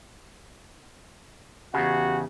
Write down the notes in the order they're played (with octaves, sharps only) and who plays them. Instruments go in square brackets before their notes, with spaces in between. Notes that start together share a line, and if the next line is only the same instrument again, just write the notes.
[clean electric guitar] E2 C#3 [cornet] F#4 [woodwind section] G4